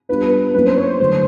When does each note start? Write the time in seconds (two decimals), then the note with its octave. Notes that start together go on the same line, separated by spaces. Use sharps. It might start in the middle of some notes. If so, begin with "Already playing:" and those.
0.09 G3 B3 D4 F4 B4
0.54 F#3 A#3 C#4 E4 B4
0.66 C5
0.77 C#5
0.89 C5
1.00 D3 F#3 A3 C5